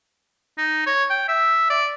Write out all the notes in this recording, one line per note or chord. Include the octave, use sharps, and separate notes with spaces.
D#4
C#5
G5
E5
D5